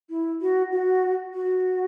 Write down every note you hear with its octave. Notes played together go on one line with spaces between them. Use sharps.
E4
F#4
F#4
F#4